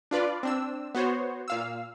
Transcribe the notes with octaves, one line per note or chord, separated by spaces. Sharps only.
D4 F4 B4 D5
C4 D4 E6
B3 F#4 C5 C#5
A#2 F5 E6